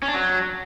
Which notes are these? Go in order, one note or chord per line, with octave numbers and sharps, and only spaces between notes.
C#4
D4
F#3